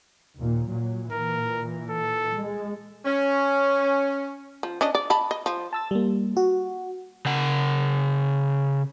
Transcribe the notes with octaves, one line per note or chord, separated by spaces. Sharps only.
D#2 A#2
A#2 F#3
A#2 E3 A#4
A4
G#3
C#4
F3
C#4 D4 D#5
D5
D#5 A5 B5
D#5
F3
A5 E6 A6
G3 A#3
F#4
C#3 F#5